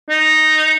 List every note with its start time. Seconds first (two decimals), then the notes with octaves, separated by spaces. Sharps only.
0.09 D#4